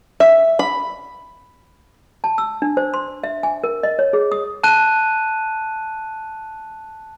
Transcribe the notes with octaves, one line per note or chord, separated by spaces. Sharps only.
E5
B5
A5
E6
D4
C5
C6
E5
G#5
A#4
D#5
C#5
G#4
D#6
A5 F#6 D#7